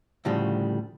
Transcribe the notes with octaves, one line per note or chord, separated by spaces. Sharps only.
D2 A2 C#3 F3 G3